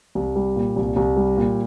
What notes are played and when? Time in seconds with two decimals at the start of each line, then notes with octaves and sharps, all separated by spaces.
0.15 C2
0.36 G3
0.56 A#2
0.76 C2
0.96 C2
1.17 G3
1.37 A#2